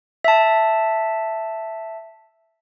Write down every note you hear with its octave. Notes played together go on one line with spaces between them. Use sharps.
E5 A5